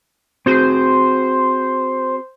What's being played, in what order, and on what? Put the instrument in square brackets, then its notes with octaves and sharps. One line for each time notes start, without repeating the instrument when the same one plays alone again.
[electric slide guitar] C4 F#4 G#4 [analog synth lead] C5